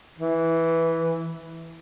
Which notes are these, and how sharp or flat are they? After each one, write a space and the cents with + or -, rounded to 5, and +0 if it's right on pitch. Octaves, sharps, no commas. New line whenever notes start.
E3 -5